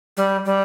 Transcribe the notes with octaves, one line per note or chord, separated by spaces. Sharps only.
G3
G3